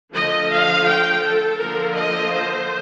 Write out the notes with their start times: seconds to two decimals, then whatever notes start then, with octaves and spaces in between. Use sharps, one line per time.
0.13 D3 F3 A3 D#5
0.50 F5
0.87 G5
1.23 A4
1.60 D3 F3 A#3 A#4
1.97 D#5
2.32 C5